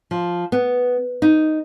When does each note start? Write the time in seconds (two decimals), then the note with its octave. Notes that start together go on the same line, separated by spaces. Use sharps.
0.11 F3
0.52 B3
1.22 D#4